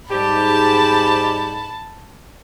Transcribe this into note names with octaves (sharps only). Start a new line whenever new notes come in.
G#2 G3 G4 A5 B5